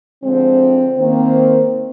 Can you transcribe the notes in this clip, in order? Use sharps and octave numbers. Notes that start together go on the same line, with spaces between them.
D3 F3 G#3 C4
D#3 A#3 C4